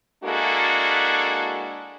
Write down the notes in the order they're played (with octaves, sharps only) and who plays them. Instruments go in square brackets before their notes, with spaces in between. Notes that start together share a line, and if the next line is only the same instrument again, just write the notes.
[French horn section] G#3 A#3 D4 E4 F#4 A4